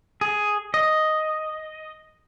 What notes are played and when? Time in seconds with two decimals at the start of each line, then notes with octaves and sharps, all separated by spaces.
0.21 G#4
0.74 D#5